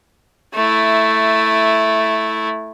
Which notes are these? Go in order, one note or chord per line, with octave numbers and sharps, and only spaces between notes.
A3 E4